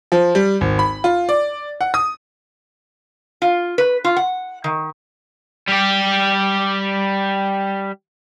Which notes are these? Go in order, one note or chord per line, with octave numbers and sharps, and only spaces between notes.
F3
G3
G#1
B5
F4
D5
F#5
D#6
F4
B4
F4
F#5
D#3
G3 G4